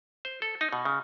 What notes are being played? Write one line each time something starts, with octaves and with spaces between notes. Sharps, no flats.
C5
A4
D#4
B2
C#3